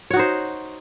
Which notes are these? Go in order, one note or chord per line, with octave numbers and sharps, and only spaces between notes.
D#4 F#4 C5 C#5